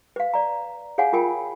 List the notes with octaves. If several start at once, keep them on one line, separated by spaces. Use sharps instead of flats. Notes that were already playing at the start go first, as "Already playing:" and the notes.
B4 F5
D5 A#5
G#4 C#5 F5 F#5 G#5
F4 A#4 G5 G#5 B5